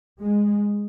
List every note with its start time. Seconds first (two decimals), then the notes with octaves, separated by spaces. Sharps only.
0.20 G#3